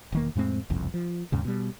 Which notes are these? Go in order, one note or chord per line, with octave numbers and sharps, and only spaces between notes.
E1 D#3 A#3
F2 A2 G#3 C4
F#1 C2 F2
F3
D#2 G#2 C#3
B2 G3